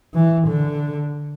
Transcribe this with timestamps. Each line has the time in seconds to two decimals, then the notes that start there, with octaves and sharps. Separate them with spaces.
0.14 E3
0.47 D3